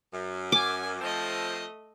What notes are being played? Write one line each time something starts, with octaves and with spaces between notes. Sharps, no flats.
F#2
G#5 D6
F3 A3 C4 D#5